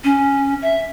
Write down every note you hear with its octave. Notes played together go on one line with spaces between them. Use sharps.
C#4
E5